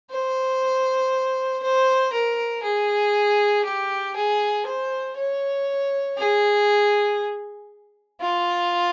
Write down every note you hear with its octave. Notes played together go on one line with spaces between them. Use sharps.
C5
C5
A#4
G#4
G4
G#4
C5
C#5
G#4
F4